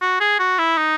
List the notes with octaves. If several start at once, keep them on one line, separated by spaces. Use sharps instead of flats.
F#4
G#4
F#4
E4
D#4